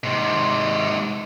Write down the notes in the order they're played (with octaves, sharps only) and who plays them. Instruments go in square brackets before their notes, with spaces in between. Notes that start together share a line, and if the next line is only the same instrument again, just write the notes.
[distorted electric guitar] G#2 C3